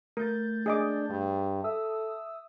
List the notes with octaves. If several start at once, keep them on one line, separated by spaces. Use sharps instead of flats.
A3 A#4 G6 A6
D4 G#4 D#5 D6
G2
A4 E5 D#6 E6